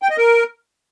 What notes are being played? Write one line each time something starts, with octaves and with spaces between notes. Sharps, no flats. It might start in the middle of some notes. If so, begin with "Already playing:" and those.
G5
D#5
A#4